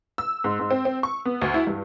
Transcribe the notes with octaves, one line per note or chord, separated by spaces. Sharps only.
E6
G#2
G#2
C4
C4
C#6
B3
D2
E4
G2